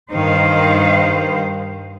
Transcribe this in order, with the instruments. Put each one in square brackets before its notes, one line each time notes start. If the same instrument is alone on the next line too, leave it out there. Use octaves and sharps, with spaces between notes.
[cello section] G2 D#3 [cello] C5 F5